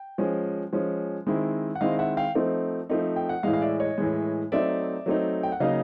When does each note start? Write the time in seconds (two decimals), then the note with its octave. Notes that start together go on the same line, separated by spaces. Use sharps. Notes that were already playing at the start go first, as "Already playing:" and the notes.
Already playing: G5
0.18 F3 G#3 C#4
0.73 F3 G#3 C#4
1.27 D#3 G#3 C4 E4
1.75 F#5
1.81 D#3 G#3 C4 E4 D#5 F5
1.99 E5 F#5
2.17 F5 G5
2.35 F3 A3 C4 D#4
2.90 F3 A3 C4 D#4
3.16 G5
3.29 F#5
3.43 A2 E3 G#3 D#5 F5
3.53 F5
3.61 D5 E5
3.80 C#5 D#5
3.98 A2 E3 G#3
4.52 F#3 A3 C4 D#4 D5 E5
5.06 F#3 A3 C4 D#4
5.43 G5
5.52 F#5
5.60 C#3 F#3 A#3 D#4 D#5 F5